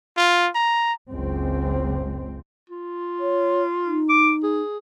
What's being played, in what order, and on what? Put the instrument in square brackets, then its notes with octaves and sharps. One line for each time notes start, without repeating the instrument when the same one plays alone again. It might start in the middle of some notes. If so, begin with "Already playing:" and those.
[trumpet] F4
A#5
[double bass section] F#1 C#2 C4
[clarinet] F4
[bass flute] C#5
D#4
[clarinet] D6
G#4